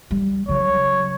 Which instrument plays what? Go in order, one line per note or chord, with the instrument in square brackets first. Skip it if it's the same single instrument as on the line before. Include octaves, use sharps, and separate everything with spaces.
[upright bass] G3
[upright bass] C#3 F#3 [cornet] C#5